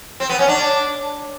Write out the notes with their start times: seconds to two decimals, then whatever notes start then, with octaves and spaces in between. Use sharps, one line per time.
0.20 C4
0.29 B3
0.39 C#4
0.48 D4